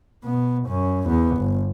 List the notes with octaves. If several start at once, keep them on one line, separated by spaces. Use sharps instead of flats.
B2 B3
F#2 C#4
E2 B3
G1